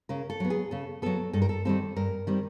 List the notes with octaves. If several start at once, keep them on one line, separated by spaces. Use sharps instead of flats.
C#3 A#4
A4
F#3 B3
G#4
C#3 A4
F#3 B3 A4
G2 A4
A#4
A4
D#3 G3 C4 A4
G2 A#4
D#3 G3 C4